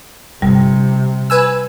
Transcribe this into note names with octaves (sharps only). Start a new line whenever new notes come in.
G1 C3 G3
B4 G#5 E6